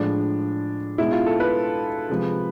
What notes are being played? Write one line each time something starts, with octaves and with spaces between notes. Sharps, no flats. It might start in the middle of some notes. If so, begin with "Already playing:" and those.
Already playing: A2 F3 G#3 D4
B2 G#3 E4
F4
A4
B4
C3 F3 G#3